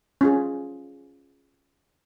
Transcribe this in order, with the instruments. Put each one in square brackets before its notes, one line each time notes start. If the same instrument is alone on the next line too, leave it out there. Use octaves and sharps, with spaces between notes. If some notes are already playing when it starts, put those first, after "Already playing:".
[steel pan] C#4 F4 G#4